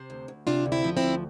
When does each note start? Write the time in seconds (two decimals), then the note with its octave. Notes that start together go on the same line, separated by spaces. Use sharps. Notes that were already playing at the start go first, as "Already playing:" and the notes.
Already playing: C3 C5
0.10 D2
0.28 D2
0.47 C3 D4 F4
0.66 D2
0.72 C4 E4
0.84 F3
0.97 C4 E4
1.03 D2